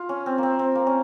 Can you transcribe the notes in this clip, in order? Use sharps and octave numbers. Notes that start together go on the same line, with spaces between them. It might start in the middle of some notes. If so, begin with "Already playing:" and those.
Already playing: F4
C#4
C4
A#3 C4
C4
A#3
C#4